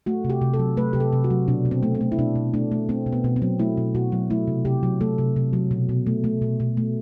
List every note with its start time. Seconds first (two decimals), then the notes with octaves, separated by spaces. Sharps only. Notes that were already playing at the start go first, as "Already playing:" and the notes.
0.06 A3 F#4
0.24 C3
0.30 G4
0.42 C3
0.54 A4
0.59 F#3
0.77 A3 B4
0.93 C3 G4
1.00 A4
1.13 C3
1.24 F#4
1.30 F#3
1.48 B2 D4
1.65 B2
1.71 C4
1.83 A3
1.95 C4
2.01 A3
2.12 E4
2.19 B2 D4
2.35 B2
2.54 A3 D4
2.72 A3
2.89 A3 C4
3.06 B2
3.13 B3
3.24 B2
3.36 C4
3.42 F#3
3.59 A3 E4
3.77 B2
3.95 B2 F#4
4.12 F#3
4.30 A3 E4
4.47 C3
4.65 C3 G4
4.83 F#3
5.01 A3 A4
5.18 C3
5.36 C3
5.53 F#3
5.71 B2
5.89 B2
6.06 A3
6.24 A3
6.42 B2
6.60 B2
6.77 A3